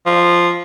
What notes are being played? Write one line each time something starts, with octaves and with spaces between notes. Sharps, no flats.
F3